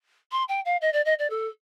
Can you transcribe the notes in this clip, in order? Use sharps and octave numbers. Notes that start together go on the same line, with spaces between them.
C6
G5
F5
D#5
D5
D#5
D5
A4